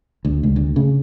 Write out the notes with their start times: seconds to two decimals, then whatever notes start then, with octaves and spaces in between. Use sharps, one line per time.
0.25 D2
0.43 C#2
0.56 D2
0.76 C#3